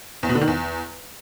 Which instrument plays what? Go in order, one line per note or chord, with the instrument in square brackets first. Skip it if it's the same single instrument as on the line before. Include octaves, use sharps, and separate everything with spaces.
[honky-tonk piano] E2
B2
D3
D#3
E2